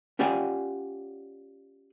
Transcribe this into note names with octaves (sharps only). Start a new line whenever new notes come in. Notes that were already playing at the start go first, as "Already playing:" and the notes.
C#4 F4 G4 D5 F#5 G#5